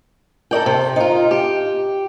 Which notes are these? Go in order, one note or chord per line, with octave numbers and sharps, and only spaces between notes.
A4 A#4 D5 G5
C3
D#4 F4
G4